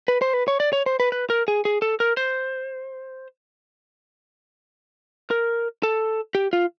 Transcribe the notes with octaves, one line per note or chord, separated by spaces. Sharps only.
B4
C5
B4
C#5
D5
C#5
C5
B4
B4
A#4
G#4
G#4
A4
A#4
C5
A#4
A4
G4
F4